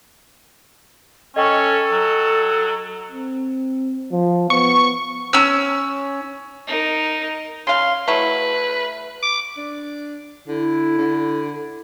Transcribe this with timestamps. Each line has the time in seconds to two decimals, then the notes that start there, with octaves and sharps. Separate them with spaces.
1.36 C#4 A4 D#5 G5 C#6
1.91 F#3
3.11 C4
4.11 F3
4.50 B3 C#6
5.33 C#4 E6
6.67 D#4 A#4
7.67 C#3 F5 C6
8.08 F#3 A3 E4 B4
9.22 D6
9.57 D4
10.48 D3 E4
10.98 D3